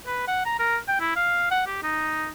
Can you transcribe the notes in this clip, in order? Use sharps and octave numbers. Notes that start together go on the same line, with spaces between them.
B4
F#5
A#5
A#4
G5
E4
F5
F#5
G4
D#4